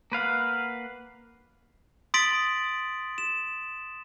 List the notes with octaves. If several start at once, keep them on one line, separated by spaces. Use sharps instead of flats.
A#3 B4 F5 F#5
C6 D#6 A6 B6 D7 F#7
E7